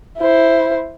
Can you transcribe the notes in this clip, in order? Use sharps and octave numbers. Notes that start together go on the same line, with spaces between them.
E4 C5